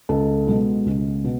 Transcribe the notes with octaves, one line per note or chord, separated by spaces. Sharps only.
C#2 A4
B2 G#3
C#2
B2